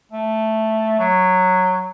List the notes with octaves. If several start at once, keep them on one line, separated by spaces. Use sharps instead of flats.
A3
F#3